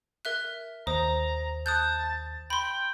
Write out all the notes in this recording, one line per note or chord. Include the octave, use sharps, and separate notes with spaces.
A#4 E5 F#6
D#2 C5 A#5 D#6
A5 D#6 F#6 G6
G5 B5 C6